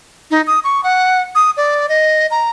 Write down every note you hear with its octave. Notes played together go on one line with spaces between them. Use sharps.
D#4
D#6
C#6
F#5
D#6
D5
D#5
A#5